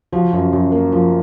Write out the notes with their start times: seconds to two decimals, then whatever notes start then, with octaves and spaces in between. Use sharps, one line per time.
0.12 F3 F#4
0.33 F#2
0.53 F#2
0.72 A#3
0.92 F3